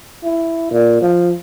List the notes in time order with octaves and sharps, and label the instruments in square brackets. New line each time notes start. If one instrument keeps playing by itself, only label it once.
[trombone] E4
A#2
F3